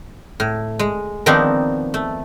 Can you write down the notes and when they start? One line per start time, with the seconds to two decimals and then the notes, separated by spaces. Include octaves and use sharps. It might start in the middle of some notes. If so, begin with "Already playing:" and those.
0.40 A2
0.79 G#3
1.26 D#3 F3 B3 C4 D4 D#4
1.94 A3